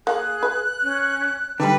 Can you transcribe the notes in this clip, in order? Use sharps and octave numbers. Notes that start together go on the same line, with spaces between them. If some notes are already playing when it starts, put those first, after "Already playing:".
A#3 G#4 F#6
B4
C#4
D3 G3 B4 G5